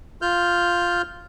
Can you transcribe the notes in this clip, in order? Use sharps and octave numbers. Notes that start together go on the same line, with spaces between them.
F4 F6 G6